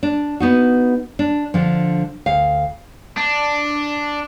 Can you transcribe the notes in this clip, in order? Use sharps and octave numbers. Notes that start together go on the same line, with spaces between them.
D4
B3 D#4 F#4
D4
D3 F3
D2 F5
D4